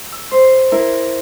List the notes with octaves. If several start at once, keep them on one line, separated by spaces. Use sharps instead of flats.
E6
C5
E4 A#4